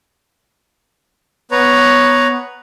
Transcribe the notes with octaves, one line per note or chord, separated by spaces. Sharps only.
B3 B4 C#5 A#5